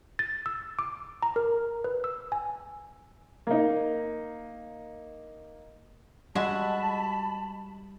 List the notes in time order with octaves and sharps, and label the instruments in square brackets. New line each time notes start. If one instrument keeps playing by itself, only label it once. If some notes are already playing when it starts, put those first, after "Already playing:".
[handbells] A6
E6
D6
A#5
A#4
B4
E6
G#5
[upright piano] A#3 D#4
[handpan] G3 [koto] G#3 [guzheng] F#4 E5 [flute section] A5 B5